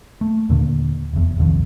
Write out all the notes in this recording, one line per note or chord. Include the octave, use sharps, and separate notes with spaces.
A3
D#2 A#2 D3 A#3
F1 E2
D#1 C2 F2 D#3